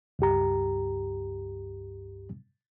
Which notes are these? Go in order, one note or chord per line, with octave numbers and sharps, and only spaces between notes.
C#2 G2 G4 A#5